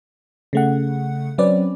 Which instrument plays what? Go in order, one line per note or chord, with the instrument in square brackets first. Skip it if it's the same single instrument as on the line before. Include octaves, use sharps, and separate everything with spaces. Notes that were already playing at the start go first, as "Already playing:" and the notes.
[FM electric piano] C#3 A3 F#5
F#3 C4 C#4 B4 D5